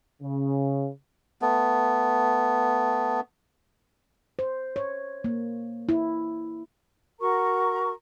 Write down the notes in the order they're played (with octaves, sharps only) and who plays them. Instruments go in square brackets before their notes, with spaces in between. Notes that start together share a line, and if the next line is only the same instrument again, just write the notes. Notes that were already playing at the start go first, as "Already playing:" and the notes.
[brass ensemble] C#3
[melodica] A3 B3
[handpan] C5
C#5
A#3
E4
[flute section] F#4 A#4 A#5 C#6